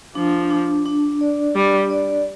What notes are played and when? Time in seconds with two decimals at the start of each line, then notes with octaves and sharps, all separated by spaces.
0.15 F3 D4
0.51 D4
0.86 D4
1.21 D5
1.55 G3 D4
1.90 D5